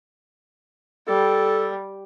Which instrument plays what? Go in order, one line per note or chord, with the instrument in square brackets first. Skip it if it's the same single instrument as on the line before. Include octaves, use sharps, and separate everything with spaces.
[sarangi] G3 [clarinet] A4